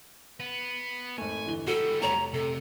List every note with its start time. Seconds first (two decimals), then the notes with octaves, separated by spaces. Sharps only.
0.40 B3
1.18 G#1 A3 G#5
1.46 G1 E3 G7
1.67 G3 B3 F#4 A4
2.02 F1 C#5 A#5
2.34 C3 A4